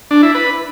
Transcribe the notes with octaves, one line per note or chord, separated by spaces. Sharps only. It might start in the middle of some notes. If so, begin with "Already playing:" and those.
D4
E4
B4